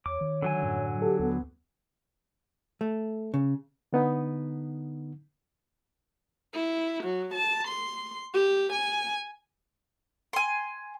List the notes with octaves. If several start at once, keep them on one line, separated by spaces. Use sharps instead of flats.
E2 C#5 D6
D#3
D3 F#3 G#5
F#2 A2
G4 A4
D#2 B3
A3
C#3
D3 B3 D#4
E4
F#3
A5
C6
G4
G#5
G#5 C6